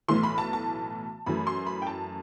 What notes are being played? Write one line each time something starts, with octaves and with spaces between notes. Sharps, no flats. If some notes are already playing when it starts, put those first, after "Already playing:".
B1 A2 E3 A3 C6
B5
A5
A5
F#2 E3 A3 B5
C6
B5
G5
A5